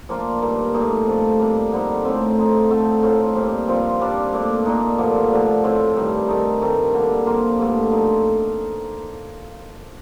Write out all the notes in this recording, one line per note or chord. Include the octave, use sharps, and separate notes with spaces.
F3 A#3 D4 F4
G2 D#3 A#3
A#2 A3 D#4
C3 F3 A3
C3 G3 A#3
D3 G3 C4 D#4
A2 A3 C4
F3 C4 D#4
D3 A3 C4 D#4
A2 A3 C4 F4
A#2 G3 C4
G2 F3 C4 F4
C3 G3 D4
A#2 A3 D4
A#2 A3 D#4
G2 D3 F3 A#3
D3 F3 A3
A2 A3 C4
G2 D#3 G3
D#3 A3 D#4
G2 D#3 A3 C4
D3 G3 A#3
C3 F3 A#3 F4
G2 D3 A3
F3 C4 D#4